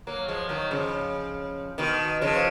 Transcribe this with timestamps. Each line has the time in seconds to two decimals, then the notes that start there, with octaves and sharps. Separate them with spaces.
0.07 F#3 A#3
0.28 F3 G#3
0.49 D#3 F#3
0.71 C#3 F3
1.78 B2 D#3
2.21 C#3 F3